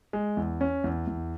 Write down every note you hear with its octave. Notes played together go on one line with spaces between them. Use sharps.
G#3
E2
C#4
E2
E2